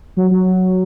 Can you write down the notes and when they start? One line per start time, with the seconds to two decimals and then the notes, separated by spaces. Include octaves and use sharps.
0.17 F#3
0.31 F#3